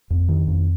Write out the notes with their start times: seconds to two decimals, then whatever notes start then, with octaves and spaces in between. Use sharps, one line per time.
0.10 F2
0.29 D#3
0.48 F2